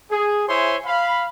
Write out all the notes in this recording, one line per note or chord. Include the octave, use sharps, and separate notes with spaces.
G#4
E4 C5 C#5 E5 G#5 C6
F5 B5